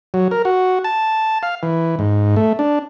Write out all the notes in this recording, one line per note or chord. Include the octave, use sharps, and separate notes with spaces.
F#3
A#4
F#4
A5
F5
E3
G#2
A3
D4